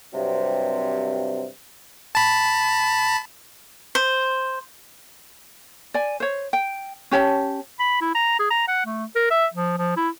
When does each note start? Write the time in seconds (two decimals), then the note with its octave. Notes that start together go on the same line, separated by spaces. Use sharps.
0.14 G2 C3 F#3 C4
2.15 A5 B5
3.95 C5
5.94 D5 G#5
6.20 C5 C#5
6.53 G5
7.11 C#4 G4 C#5 A5
7.80 B5
8.01 E4
8.15 A#5
8.39 G#4
8.51 A#5
8.68 F#5
8.86 A3
9.16 A#4
9.31 E5
9.54 F3
9.78 F3
9.97 E4